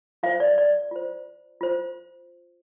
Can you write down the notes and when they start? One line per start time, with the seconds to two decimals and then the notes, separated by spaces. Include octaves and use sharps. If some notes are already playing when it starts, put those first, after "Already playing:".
0.23 F4 C5 F5
0.40 D5
0.58 D5
0.91 F4 C5
1.61 F4 C5